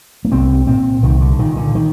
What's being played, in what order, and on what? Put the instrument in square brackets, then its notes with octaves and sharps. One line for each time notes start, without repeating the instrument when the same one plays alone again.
[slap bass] A#3
C2 C4
A#2 C4
C2 D#3
D3
A#2 D#3
D3
D#3